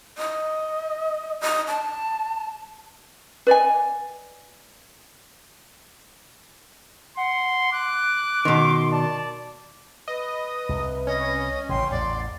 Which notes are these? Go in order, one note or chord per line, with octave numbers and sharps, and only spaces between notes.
D#5
D#5
A5
B4 D5 D#5 G#5
F#5 C6
D6 F#6
B2 D#3 C6
D5 A5
B4 D#5
C2
C#4 D#5
A1 C#3 G5 C6
A1 E2 D5 C6